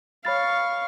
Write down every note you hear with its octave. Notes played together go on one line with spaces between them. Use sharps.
C#5 F5 B5 C#6 A6